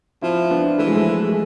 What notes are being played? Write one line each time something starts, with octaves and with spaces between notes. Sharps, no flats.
F3 C4 E4
B3 D4
E3 A3
G#3
F3 A3
G#3